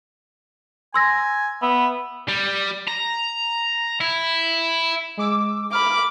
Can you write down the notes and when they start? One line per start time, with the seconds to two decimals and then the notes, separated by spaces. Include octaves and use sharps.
0.94 G#5 C6 E6 A#6
1.62 B3 E5
2.28 G3
2.88 A#5
4.01 E4
5.17 G#3 D6 E6
5.72 B5 D6 F6